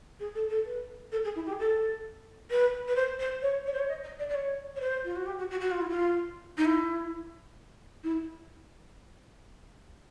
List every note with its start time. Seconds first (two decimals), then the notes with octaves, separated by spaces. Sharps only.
0.19 G#4
0.35 A4
0.50 A4
0.65 B4
1.12 A4
1.24 G#4
1.35 E4
1.46 G4
1.52 G#4
1.58 A4
2.51 B4
2.88 B4
2.96 C5
3.19 C5
3.42 C#5
3.66 C#5
3.73 C5
3.79 C#5
3.88 D#5
4.04 D#5
4.19 D5
4.29 D5
4.34 C#5
4.76 C#5
4.80 C5
5.04 F4
5.16 F#4
5.26 G4
5.39 F#4
5.50 F#4
5.60 F#4
5.71 F4
5.80 E4
5.89 F4
6.57 D#4
6.65 E4
8.04 E4